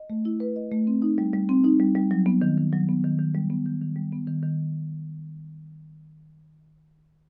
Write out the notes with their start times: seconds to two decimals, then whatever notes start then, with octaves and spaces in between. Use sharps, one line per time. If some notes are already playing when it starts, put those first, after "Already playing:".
Already playing: D#5
0.10 A3
0.25 E4
0.40 B4
0.56 D#5
0.71 A3
0.87 C4
1.02 D#4
1.18 G3
1.34 G3
1.49 C4
1.64 D#4
1.80 G3
1.95 G3
2.11 F#3
2.26 B3
2.42 D#3
2.57 D#3
2.73 F#3
2.89 B3
3.04 D#3
3.19 D#3
3.35 G3
3.50 B3
3.66 D#3
3.82 D#3
3.96 G3
4.12 B3
4.27 D#3
4.43 D#3